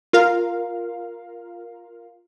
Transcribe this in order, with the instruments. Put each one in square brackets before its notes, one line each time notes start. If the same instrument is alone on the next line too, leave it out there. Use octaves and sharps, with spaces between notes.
[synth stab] F4 A#4 F5